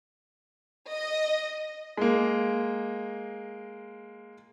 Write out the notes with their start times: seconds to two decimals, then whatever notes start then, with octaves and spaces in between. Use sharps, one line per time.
0.90 D#5
1.97 G#3 A#3